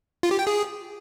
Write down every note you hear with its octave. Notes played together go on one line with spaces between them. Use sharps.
F4
G4
G5
G#4